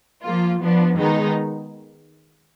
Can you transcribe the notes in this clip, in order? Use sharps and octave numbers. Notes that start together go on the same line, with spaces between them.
F3 A#3 F4
F3 B3 D4
D#3 G#3 B3 D#4